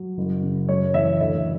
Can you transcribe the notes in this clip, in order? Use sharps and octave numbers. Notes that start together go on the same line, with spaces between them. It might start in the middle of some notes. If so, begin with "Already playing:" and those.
Already playing: F#3
F#1
C#3
F#2 C#5
E3 E5
D2 E5